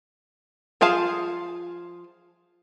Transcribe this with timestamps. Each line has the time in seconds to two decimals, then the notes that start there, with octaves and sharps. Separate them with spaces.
0.81 F3 F4 G#4 F5 A5